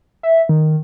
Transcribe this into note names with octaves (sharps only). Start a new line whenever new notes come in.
E5
D#3